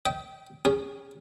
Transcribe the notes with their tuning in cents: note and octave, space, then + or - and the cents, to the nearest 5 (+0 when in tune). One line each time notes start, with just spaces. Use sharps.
D#5 +35 G5 -15
C#4 +0 G#4 -30